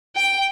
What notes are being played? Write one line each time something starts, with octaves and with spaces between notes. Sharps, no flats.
G5